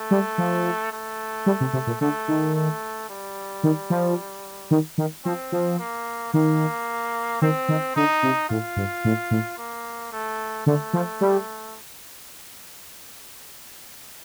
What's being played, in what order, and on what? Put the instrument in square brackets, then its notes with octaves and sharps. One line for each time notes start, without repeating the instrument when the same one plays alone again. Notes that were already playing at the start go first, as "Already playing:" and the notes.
Already playing: [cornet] A3
[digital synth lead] G3
F3
[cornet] A3
[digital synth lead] G3
C3
C3
A#2
[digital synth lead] D3 [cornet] A3
[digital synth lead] D#3
[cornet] A3
G3
[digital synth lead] D#3
F3
D#3
D#3
[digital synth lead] F3 [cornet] C4
[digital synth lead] F3
[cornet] A#3
[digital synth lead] D#3 [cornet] A#3
[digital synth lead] D#3 [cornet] C4
[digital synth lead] D#3
[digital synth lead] D3 [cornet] D#4
[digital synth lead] C3
[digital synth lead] A2 [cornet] F4
[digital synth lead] G2
A2
A2
[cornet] A#3
A3
[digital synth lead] D3 [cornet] A3
[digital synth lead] F3
G3